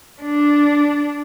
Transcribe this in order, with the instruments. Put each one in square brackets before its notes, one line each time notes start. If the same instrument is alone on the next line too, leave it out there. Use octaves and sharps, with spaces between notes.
[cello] D4